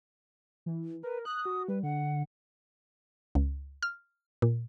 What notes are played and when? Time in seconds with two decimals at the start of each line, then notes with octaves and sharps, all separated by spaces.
0.66 E3
1.03 A#4 B4
1.25 D#6 F#6
1.45 F#4
1.68 G3 B4
1.83 D3 F#5
3.35 C#2
3.82 F6
4.42 A#2